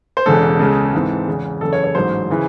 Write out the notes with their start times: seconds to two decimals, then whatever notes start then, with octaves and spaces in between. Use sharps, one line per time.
0.17 C5
0.26 E1 E2 C#3 G#3 A4
0.59 C#2 C#3 G#3
0.93 G#2 E3 C4
1.27 E2 C#3 G#3
1.61 F#1 E2 C#3 A4
1.73 C#5
1.84 C#5
1.95 A1 G#2 F#3 C5
2.30 C#3 E3